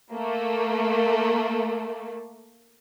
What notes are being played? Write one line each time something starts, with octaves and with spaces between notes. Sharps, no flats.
A3 A#3